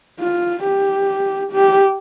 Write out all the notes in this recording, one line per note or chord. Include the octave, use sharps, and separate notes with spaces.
F4
G4
G4